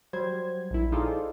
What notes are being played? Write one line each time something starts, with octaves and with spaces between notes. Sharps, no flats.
F#3 G3 C5 G#6
A#1 E4
D#4 F4 G#4 A4 C5 D5